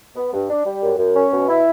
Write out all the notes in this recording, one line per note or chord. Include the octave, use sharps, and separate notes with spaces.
B3
G2
D4
G3
F#2
F#2
C#4
B2
E4